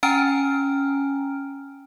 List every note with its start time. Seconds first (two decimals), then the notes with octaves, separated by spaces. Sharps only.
0.03 C#4 G5 G#5 A#5 F6 D7